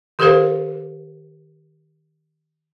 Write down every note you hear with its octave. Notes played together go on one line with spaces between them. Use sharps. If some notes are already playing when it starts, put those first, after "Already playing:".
D#3 G4 A4 A#4 C5 F5